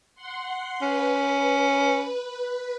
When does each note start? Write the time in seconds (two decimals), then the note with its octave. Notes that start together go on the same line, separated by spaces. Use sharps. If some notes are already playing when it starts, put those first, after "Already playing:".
0.15 F#5 C6
0.82 C#4 B4